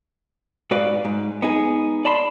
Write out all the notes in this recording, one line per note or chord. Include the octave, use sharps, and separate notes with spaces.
G#2 F#4 B4 D5 F5
G#2
B3 D#4 G#4
D5 A5 B5 C6